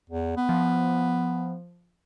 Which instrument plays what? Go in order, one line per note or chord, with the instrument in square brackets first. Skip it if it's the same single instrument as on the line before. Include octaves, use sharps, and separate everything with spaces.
[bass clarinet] E2
B3
[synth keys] F3